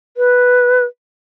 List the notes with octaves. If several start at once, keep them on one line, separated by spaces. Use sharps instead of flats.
B4